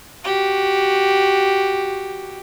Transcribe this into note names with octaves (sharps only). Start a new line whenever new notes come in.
F#4 G4